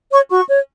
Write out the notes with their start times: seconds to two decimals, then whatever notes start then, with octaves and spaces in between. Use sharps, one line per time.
0.12 C#5 C#6
0.30 F#4 C#6
0.50 C#5